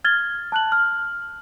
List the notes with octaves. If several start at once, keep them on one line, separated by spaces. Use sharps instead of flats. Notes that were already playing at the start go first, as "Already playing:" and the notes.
F6 G#6 A6 G7
A5 F#6 F#7
F6